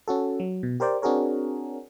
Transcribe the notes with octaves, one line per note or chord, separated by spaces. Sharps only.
C#4 F#4 A4
F#3
B2
G4 A#4 C5 D5 G5
C4 D4 F#4 G#4 A#4 C#5